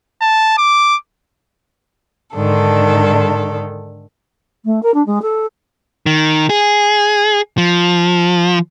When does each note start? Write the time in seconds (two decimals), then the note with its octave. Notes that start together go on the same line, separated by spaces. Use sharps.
0.21 A5
0.58 D6
2.35 G#2 D3 D#3 D4 A4
4.65 A3
4.82 A#4
4.94 D4
5.06 G#3
5.22 A4
6.06 D#3
6.50 G#4
7.58 F3